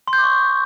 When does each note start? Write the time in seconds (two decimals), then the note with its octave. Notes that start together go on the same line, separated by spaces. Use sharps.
0.08 C6
0.13 G6
0.18 D6
0.24 C#6